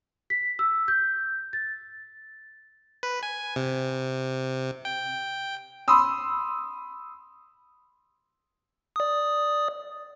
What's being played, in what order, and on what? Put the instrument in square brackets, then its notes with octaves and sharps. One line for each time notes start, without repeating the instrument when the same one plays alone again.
[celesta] B6
E6
G6
A6
[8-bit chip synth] B4
G#5
C3
G5
[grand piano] B5 C6 D#6 E6
[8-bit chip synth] D5 D#6